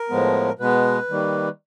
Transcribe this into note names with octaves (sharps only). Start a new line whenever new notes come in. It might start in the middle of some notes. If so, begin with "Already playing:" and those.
Already playing: A#4
A2 F3 G#3 B3
B2 G#3 B3 B4
D#3 G3 A#3